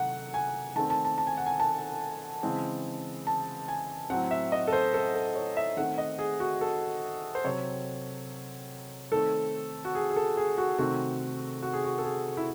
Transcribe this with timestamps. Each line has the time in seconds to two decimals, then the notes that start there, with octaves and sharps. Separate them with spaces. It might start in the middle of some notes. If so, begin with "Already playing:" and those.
Already playing: C3 D#3 F#3 A3 F#5
0.34 G#5
0.76 D#3 A3 C4 A5
0.90 A5
1.05 A5
1.18 A5
1.27 G#5
1.37 F#5
1.46 G#5
1.60 A5
2.43 C#3 E3 G#3 C4
3.27 A5
3.68 G#5
4.10 A2 F#3 C4 F#5
4.31 E5
4.52 D#5
4.67 A4
4.73 C5
4.94 A4
5.15 A4
5.36 C#5
5.57 E5
5.77 D#3 A3 C4 F#5
5.98 D#5
6.19 G#4
6.40 F#4
6.61 A4
7.35 C5
7.44 C3 F#3 C4 C#5
9.12 D#3 A3 C4 A4
9.85 F#4
9.95 G#4
10.11 G#4
10.16 A4
10.37 G#4
10.58 F#4
10.78 C3 D#3 A3 C4 F#4
11.62 F#4
11.73 G#4
11.84 F#4
11.98 A4
12.04 G#4
12.37 E4